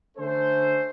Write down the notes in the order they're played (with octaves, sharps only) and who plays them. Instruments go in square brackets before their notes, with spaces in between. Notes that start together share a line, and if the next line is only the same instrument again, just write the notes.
[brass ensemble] D3 A3 C#4 A4 C5